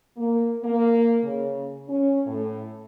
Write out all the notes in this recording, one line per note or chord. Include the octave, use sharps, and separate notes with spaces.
A#3
A#3
C#3
C#4
A2